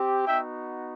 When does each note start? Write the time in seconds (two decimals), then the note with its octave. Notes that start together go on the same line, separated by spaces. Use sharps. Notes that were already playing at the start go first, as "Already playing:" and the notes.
Already playing: C4 G4
0.25 B3 D#4 F#4 E5 G5